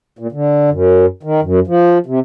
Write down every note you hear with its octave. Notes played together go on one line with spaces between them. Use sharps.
A#2
D3
F#2
D#3
F#2
F3
C3